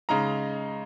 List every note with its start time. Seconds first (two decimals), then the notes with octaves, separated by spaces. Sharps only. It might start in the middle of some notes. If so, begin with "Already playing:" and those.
0.09 C#3 G#3 D#4 A#5